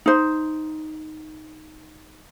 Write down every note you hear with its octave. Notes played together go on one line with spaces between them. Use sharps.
D#4 C5